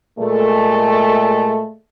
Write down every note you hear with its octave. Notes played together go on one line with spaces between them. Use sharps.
A#2 G#3 A3